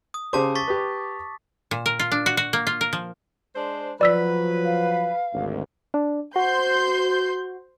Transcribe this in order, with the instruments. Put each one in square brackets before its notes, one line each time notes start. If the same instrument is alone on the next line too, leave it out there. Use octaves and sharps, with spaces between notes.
[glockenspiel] D#6
[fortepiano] C#3 G4 C5 [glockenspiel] A5 D6
[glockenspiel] C#6 A6 B6
[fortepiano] G4 B4
[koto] A#2
A#4
F4
D4
F#4
F#4
A#3
F4
A#4
F3
[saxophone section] G#3 D4 C5
[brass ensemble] F3 F#3 [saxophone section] B4 [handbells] D5 E6 B6
[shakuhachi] F5
[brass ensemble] G#1 D2
[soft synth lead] D4
[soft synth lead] F#4 [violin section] C5 C6 G6